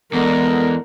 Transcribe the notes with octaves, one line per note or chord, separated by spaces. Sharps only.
E2 D3 G#3 B3 A#4